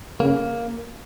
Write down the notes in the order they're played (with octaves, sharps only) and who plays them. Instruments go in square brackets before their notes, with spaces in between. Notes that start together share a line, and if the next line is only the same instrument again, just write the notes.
[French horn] C#3 [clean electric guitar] A#3